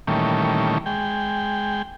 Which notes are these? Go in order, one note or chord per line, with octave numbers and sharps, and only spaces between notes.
A#2 D#3 E3 G3 A3 C#4
G#3 G5